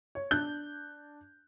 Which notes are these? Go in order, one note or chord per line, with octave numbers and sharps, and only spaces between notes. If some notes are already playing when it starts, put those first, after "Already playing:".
C#5
D4 F#6 G6 G7